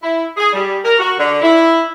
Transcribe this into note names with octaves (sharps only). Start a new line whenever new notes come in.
E4
G#4
G3
A#4
F#4
D3
E4